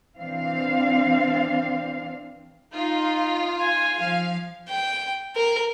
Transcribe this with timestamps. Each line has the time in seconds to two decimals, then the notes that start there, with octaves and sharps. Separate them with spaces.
0.18 E3 C4 D4 F5
2.74 D#4 F4
3.61 G#5
3.98 F3 F5
4.69 G5
5.36 A#4